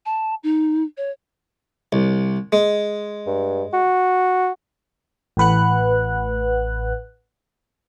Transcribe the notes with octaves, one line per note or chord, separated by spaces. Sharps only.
A5
D#4
C#5
C2
G#3
G2
F#4
A1 A2 B4 F#5 F#6